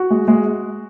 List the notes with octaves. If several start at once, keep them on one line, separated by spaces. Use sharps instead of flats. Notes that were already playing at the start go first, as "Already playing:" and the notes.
Already playing: F#4
G#3
G#3